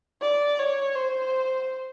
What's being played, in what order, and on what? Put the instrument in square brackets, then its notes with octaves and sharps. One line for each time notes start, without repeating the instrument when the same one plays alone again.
[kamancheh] D5
C#5
C5